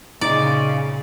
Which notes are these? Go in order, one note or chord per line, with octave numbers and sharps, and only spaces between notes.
A#2 C#3 D#4 D5